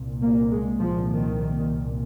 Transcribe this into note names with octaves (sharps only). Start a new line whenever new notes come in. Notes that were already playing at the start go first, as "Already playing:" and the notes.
Already playing: C2 A#2
A#3
G#3
F3
D#3